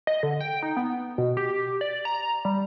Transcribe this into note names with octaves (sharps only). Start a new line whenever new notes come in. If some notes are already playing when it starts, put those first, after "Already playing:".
D#5
D3
G5
D#4
B3
B2
G4
D5
A#5
G3